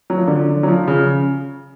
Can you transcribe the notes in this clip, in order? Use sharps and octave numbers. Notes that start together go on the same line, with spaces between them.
F#3
F3
D3
F#3
F3
C#3